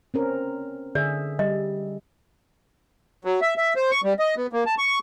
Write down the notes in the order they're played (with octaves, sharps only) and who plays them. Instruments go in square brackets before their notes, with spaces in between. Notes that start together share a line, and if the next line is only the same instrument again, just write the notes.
[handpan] C4 C#4 A#4
[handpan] D3 G#4 E5 [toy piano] D5
[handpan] G3 [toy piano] D#5
[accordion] F#3
E5
E5
C5
C#6
G3
D#5
B3
A#3
A5
C#6